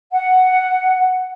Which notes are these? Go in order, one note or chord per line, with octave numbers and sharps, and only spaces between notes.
F#5